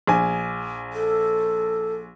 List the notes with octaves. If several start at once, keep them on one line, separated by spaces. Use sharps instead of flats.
A#1 G#5
A4